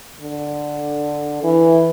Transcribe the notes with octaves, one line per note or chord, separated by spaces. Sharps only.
D3
E3